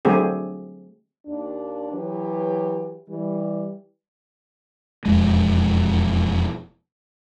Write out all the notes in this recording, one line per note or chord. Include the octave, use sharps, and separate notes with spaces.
D3 F#3 A3 C4 G4 G#4
D#2 D4
E3 F#3 G4 B4 C#5
E3 G3
E1 F2 G#3